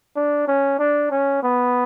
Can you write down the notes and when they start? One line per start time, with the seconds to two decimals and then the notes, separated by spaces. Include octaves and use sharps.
0.16 D4
0.48 C#4
0.79 D4
1.11 C#4
1.43 B3